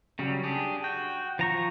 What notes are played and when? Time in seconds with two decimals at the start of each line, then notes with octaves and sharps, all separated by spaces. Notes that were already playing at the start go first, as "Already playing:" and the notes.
0.19 C#3 F#3 G3
0.43 D4 G4 G#4
0.84 F#4 G5
1.39 F3 A#5 C#6